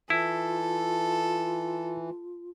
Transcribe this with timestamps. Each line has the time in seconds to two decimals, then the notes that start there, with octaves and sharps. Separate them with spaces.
0.10 E3 E4 F4 A4